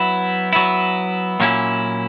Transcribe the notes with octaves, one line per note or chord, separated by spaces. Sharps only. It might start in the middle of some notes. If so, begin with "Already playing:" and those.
Already playing: F#3 B3 E4
F#3 B3 E4
A#2 F#3 A#3 C#4 E4